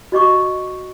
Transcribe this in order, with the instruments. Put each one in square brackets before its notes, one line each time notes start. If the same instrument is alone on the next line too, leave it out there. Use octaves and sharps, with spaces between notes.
[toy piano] F#4 D#5 C#6 D6